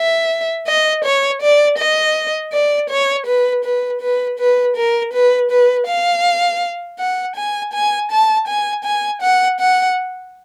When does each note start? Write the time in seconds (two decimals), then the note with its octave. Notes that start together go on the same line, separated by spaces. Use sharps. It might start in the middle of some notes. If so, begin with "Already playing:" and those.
Already playing: E5
0.67 D#5
1.04 C#5
1.42 D5
1.78 D#5
2.53 D5
2.90 C#5
3.27 B4
3.64 B4
4.01 B4
4.39 B4
4.76 A#4
5.13 B4
5.51 B4
5.87 F5
6.99 F#5
7.36 G#5
7.73 G#5
8.11 A5
8.47 G#5
8.84 G#5
9.22 F#5
9.60 F#5